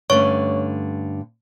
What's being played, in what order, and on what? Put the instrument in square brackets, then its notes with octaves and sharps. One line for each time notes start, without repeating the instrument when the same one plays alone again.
[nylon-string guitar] G2 D3 A3 C#4 [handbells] C#5 C#6